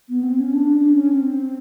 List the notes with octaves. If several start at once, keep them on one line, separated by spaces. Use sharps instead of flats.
B3
C4
C#4
D4
D4
C#4
C4